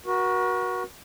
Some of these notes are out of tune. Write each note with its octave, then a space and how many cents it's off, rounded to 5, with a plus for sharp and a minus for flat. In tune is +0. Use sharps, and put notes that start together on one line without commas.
F#4 +0 A#4 +45